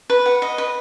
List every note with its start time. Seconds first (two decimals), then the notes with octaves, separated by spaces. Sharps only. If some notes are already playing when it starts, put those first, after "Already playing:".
0.10 B4
0.26 F#5
0.42 D#5
0.58 B4